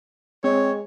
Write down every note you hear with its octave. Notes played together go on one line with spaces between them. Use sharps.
G#3 C4 C#5